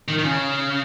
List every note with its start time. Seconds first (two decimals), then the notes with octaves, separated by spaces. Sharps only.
0.08 D#3
0.18 D#3
0.25 C#3